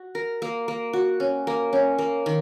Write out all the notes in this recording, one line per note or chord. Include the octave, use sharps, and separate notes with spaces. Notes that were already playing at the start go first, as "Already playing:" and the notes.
Already playing: F#4
A#4
A#3
A#3
F#4
C#4
A#3
C#4
A#3
D#3